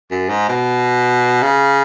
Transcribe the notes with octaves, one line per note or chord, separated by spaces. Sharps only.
F#2
G#2
B2
C#3